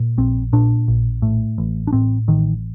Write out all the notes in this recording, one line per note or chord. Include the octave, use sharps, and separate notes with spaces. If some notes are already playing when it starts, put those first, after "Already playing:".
Already playing: A#2
A#1 C4
A#2 D4
A#1
A2
A1
D4
A2 C4
A1 D#3